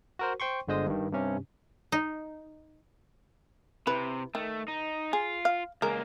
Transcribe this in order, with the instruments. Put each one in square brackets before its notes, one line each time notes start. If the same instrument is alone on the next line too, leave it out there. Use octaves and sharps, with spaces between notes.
[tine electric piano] F#4 A#4 C5
C5 G5 C6 C#6
G1 D3 G#3 C5 D#5 D#6
G2 D#3
G2 C3 C#4
[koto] D#4
[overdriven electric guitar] C3 [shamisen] E4 B4
[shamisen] D#3 [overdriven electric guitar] A3
[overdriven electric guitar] D#4
[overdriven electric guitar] F4 [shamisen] G#4
[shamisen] F5
[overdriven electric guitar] C#2 A#3 [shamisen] G#3 A#4